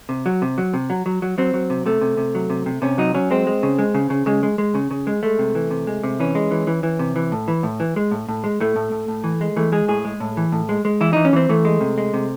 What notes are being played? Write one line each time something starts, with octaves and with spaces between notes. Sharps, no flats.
C3
F#3
C3
F#3
C3
F#3
F#3
F#3
F#3 C4
F#3
C3
C3 A3
C3
C3
F#3
C3
C3
C3 C#4
F#3 D#4
F#3 C#4
G#3 C4
G#3
C#3
G#3
C#3
C#3
C#3 G#3
G#3
G#3
C#3
C#3
G#3
G#3 A3
C3
E3
C3
G#3
C3
E3 C#4
G#3
E3
E3
E3
C3
E3
A2
E3
A2
E3
G#3
A2
A2
G#3
A2 A3
A2
A2
A2
E3
G#3
E3 A3
G#3 G#4
A2 G#4
G#3
A2
E3
A2
G#3
G#3
E3 E4
E3 D#4
C#4
E3 C4
E3 A3
G#3
C3
G#3
C3